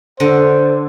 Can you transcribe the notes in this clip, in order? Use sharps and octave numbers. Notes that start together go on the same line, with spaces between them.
D3 C5